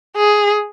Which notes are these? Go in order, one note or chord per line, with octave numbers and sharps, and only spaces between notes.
G#4